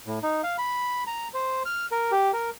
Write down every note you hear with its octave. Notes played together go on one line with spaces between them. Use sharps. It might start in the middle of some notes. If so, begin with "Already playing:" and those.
A2
D#4
F5
B5
A#5
C5
F6
A#4
G4
A#4